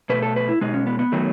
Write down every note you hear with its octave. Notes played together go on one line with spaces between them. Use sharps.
B2 A3 B4
A4
B4
E4
B2 G#3 D#4
C#4
B3
B3
D#3 F#3 A3